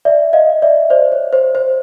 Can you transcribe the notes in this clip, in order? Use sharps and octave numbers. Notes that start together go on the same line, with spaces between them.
D5 E5
D#5 F5
D5 E5
C5 D5
C#5
C5
C5